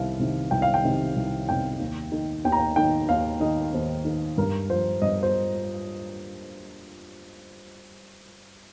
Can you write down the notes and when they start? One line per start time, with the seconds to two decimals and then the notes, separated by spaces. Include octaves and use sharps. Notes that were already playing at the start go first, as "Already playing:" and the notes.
Already playing: C2 C3 D#3 F5
0.20 C3 D#3
0.51 C2 G5
0.62 F5
0.74 G5
0.83 C3 D#3
1.16 C2
1.48 C3 D#3 G5
1.80 D#2
2.12 D#3
2.45 D#2 G5
2.52 A#5
2.59 G5
2.76 D#3 G5
3.09 D#2 F5
3.40 D#3 D#5
3.74 D#2 C5
4.05 D#3
4.37 G2 A#4
4.70 F3 C5
5.02 G2 D#5
5.23 C5